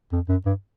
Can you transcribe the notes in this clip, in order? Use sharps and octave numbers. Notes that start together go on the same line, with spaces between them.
F2
F#2
G2